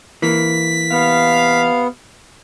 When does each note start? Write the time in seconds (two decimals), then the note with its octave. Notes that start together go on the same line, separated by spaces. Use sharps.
0.22 E3 A#3 B6
0.91 C3 B3 F5